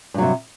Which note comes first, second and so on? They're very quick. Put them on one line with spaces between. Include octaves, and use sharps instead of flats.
G2 F#3 C3